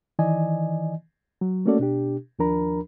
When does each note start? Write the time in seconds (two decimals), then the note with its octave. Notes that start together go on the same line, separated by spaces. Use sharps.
0.19 D#3 E3 D5 D#5 G#5
1.41 F#3
1.66 A3 A#3 C#4 F#4 A4 D5
1.79 B2 D4 G4
2.39 D#2 F3 D4 A#4 A#5 B5